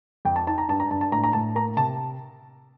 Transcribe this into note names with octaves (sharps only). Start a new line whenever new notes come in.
F2 G5
A5
D#4 A5
A#5
G2 A5
A#5
G2 A5
A5
A2 A#5
A#5
A2 A5
A#3 A#5
C3 A5